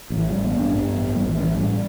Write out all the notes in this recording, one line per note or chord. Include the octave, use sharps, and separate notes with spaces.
A1
E3
A1 G3
B3
G2
D4
G2 B3
A1
A1 G3
E3
A1
E3
A2 G3